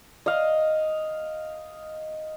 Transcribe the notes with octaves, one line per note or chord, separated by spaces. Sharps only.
D#5 F5